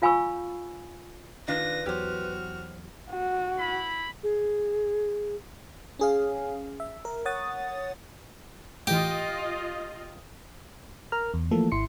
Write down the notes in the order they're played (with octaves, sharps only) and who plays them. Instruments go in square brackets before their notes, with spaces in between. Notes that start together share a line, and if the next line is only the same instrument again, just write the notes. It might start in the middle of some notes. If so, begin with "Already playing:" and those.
[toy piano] F4 F5 G#5 B5 C#6 E6
[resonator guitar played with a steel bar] D#3 D4 F4 [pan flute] B4 [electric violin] A#6
[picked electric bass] E2 F#3 [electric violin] F#4 F6 [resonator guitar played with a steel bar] G4 C5
[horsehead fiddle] F#4
[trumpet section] E4 B5
[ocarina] G#4
[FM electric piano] C#4 G#4 F5
E5
A#4
C#5 F#5 D#6 A6
[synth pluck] A2 E3 [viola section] F4 D#5 [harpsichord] G4
[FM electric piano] A#4 A#5 F6
E2
E3 F3 A3 A#3 A4
G#1 E4 C6 C#7